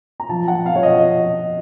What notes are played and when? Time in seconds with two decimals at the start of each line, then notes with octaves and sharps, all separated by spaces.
0.20 A#5
0.29 F3 A5
0.48 F3 F#5
0.66 F5
0.75 F3 C#5
0.83 D#5